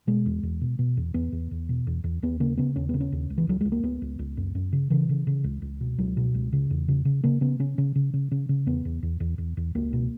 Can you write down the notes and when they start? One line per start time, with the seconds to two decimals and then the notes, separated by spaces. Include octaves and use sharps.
0.07 B2 G#3
0.26 E2
0.43 E2
0.61 B2
0.79 B2
0.97 E2
1.14 E2 B3
1.32 E2
1.51 E2
1.69 B2
1.87 E2
2.04 E2
2.22 D#2 B3
2.40 C#3 A#3
2.57 C#3 B3
2.76 D#2 C#4
2.89 C#3 B3
3.00 C#4
3.12 D#2
3.30 C#2
3.38 E3
3.47 C#2 F#3
3.61 C#2 G#3
3.72 A#3
3.83 C#2 B3
4.02 C#2
4.19 C#2
4.37 F#2
4.55 F#2
4.72 C#3
4.90 C#3 E3
5.09 C#3
5.27 C#3
5.44 C#2
5.62 C#2
5.81 B2
5.98 C#2 F#3
6.17 B2
6.35 C#2
6.53 C#3
6.70 E2
6.88 C#3
7.05 C#3
7.24 C#3 A#3
7.41 C#3 B3
7.59 C#3 C#4
7.78 C#3
7.95 C#3
8.13 C#3
8.31 C#3
8.49 C#3
8.66 E2 B3
8.85 E2
9.03 E2
9.20 E2
9.38 E2
9.57 E2
9.75 C#2 A#3
9.93 B2